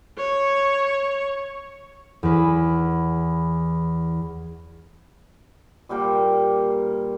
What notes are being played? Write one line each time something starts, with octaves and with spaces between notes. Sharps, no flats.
C#5
E2 B4
A#2 G3 A#3 G5